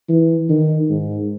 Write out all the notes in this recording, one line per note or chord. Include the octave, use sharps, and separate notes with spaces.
E3
D#3
G#2